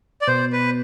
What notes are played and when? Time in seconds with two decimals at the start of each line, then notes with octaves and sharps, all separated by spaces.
0.21 D5
0.28 B2 C5
0.53 B4